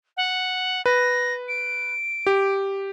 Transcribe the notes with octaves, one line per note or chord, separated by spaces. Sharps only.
F#5
B4 A#6
D7
G4